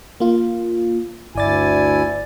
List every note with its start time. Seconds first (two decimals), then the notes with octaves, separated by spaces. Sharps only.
0.20 A#3 F4
1.35 G1 D2 E4 D5 G#5 A6